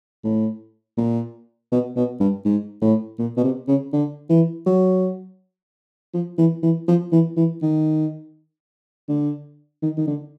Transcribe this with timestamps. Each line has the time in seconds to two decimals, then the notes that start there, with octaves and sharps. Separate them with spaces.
0.24 A2
0.98 A#2
1.72 B2
1.96 B2
2.20 G2
2.45 G#2
2.82 A2
3.19 A#2
3.37 B2
3.44 C3
3.68 C#3
3.93 D3
4.30 E3
4.66 F#3
6.14 F3
6.38 E3
6.63 E3
6.88 F3
7.12 E3
7.37 E3
7.62 D#3
9.09 D3
9.82 D#3
9.97 D#3
10.07 D3